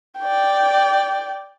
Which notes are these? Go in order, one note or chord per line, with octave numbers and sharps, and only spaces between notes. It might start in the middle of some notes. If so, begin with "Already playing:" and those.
D5 G5